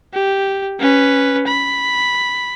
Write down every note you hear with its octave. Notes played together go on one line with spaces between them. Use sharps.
G4
C#4 B4
B5